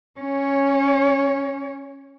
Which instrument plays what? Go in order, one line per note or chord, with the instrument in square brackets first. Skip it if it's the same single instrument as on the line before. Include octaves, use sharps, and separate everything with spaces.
[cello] C#4 C#5